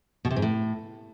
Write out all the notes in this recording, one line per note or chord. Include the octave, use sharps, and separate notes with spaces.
B2
C3
G#2
A2